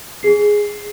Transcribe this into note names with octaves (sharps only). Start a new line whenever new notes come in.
G#4 C7